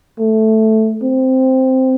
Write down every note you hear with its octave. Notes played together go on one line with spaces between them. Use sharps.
A3
C4